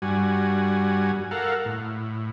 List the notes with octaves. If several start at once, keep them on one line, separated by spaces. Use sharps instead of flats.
G2 G3 F#4 G#5
A4 A#4 F5 F#5
A2